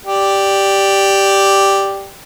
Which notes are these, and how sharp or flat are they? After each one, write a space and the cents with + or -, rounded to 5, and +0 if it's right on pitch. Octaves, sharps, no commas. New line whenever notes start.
G4 +0 D5 +0